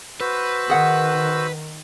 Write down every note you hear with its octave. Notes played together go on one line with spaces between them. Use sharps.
F#4 B4 C5 E6
D#3 G#4 F#5